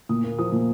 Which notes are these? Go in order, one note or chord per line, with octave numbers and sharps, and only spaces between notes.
A#2 D#6
A#3
F3 D#6
A#2